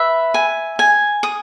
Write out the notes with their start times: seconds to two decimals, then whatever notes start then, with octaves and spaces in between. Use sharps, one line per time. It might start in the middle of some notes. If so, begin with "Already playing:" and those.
Already playing: B4 E5
0.34 G#5
0.79 G#5
1.23 D#6